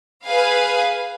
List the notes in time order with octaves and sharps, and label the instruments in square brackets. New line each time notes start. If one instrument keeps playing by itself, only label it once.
[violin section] G#4 B4 F5 G#5